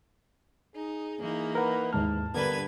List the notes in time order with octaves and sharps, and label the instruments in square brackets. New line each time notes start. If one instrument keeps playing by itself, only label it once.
[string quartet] D#4 [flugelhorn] G#4
[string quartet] E3 A#3 D#4
[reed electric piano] A#4 F#5 [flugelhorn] B4
[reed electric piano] D#2 G#2 F6 [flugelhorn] A5
[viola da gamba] G2 D3 B4 [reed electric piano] B3 A#4 [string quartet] G#6